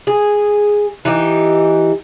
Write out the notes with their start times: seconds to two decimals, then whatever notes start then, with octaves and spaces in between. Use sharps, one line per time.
0.07 G#4
1.05 E3 D#4 G4